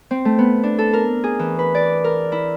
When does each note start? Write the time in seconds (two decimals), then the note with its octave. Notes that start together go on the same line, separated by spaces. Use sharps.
0.11 C4
0.25 A3
0.38 B3
0.63 D4
0.78 A4
0.93 A#4
1.24 G#4
1.39 E3
1.59 B4
1.75 D5
2.04 A#4
2.32 E4